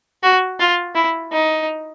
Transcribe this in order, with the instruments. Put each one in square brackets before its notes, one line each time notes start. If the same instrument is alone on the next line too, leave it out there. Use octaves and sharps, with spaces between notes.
[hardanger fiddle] F#4
F4
E4
D#4